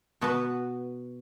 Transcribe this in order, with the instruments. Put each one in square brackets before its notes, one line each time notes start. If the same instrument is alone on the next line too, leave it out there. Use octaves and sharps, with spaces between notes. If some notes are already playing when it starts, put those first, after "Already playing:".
[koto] B2 B3 F#4 B4